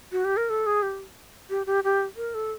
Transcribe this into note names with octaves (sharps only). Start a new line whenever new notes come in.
F#4
G4
A#4
A4
G#4
G4
G4
G4
G4
A#4
A4